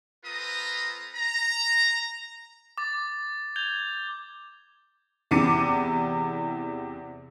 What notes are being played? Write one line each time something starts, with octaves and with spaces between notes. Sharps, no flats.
C4 F4 A4 B4 A#5 D#6
A#5
D6 A6
G6 G#6 F7 G7
E2 C3 E4 D6 C#7 D#7